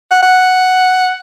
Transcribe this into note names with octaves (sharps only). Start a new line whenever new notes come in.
F#5
F#5